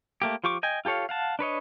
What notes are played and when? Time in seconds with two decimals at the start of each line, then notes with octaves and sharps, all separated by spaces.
0.22 A3 A#3 G4
0.44 F3 F4 G4 C#6 D6
0.63 D#5 G5 G#5
0.85 F4 G4 A4 C#5 F5
1.09 F5 F#5 A5
1.39 D4 B4 C#5 D#5